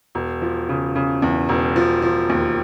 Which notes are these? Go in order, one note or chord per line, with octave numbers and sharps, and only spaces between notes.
E1
F3
C#3
C#3
E2
E1
F3
F3
D#2